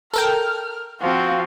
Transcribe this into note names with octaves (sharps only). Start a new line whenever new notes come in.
A4 A#4 G5 F6
F3 C4 F#4 F5